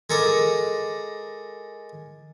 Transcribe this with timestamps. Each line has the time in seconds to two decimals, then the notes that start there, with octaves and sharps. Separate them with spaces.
0.10 G#3 A4 A#4 D5